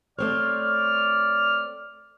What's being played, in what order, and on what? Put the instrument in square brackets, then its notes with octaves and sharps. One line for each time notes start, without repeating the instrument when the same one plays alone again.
[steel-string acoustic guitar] A3 C4 C#5 [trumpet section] D5 [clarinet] F6